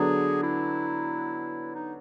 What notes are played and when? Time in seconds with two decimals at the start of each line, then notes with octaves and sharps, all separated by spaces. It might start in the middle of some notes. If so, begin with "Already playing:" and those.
Already playing: D3 F#3 B3 D4 G#4
0.43 E4
1.75 D#4